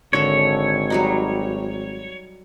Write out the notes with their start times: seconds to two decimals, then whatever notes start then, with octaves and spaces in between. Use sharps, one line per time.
0.13 G#1 D3 A4 C#5
0.90 F#3 G3 D#4